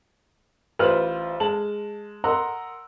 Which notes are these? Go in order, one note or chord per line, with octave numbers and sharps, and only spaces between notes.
A1 F4 B4 C5 F6 F#7
G#3 A5 F#7
A#4 D#5 F#5 A#5 C6 E6